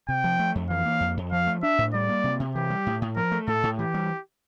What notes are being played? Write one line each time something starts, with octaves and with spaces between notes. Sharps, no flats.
C3 G5
F3
A3
F2
E3 F5
A#3
F2
F2
F3 F5
A3
D4 E5
A2
G3 D5
A#3
C3
C3
E3 G4
G3
A2
A2
F3 A#4
A3
A2 A4
A2
E3 G4
G3